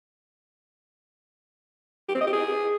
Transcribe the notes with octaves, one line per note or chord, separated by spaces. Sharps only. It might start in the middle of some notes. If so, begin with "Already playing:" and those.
G4
C4
D#5
G4
G#4